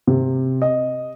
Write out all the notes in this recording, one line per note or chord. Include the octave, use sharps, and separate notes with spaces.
C3
D#5